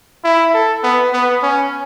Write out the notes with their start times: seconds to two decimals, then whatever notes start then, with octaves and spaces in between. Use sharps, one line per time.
0.25 E4
0.54 A4
0.83 B3
1.13 B3
1.43 C#4